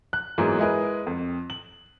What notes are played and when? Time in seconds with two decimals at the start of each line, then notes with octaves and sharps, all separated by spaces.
0.13 F#6
0.38 G#2 E3 F#3 A#3 B3 G#4
0.59 G#3 E4 G#4 A#4 B4
1.07 F2
1.50 F#7